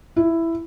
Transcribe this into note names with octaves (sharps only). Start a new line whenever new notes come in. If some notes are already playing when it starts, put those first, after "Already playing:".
E4